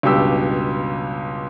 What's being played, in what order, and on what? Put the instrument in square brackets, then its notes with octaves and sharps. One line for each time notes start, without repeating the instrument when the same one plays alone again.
[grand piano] C#2 G2 B2 G4 E6